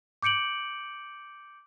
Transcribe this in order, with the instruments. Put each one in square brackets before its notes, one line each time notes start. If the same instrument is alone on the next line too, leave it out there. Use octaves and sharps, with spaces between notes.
[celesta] D6 G6 C#7 D7 F#7